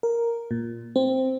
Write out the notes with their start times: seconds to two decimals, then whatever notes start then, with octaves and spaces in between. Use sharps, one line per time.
0.03 A#4
0.51 A#2
0.96 C4